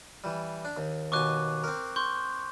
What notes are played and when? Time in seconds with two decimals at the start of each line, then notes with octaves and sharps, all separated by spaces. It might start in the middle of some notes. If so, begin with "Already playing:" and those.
0.24 E3 G3
0.65 D4
0.77 D#2
1.12 D#2 B2 G#5 C#6 D6 F#6
1.64 C4 A#4
1.96 C6 C#6 G6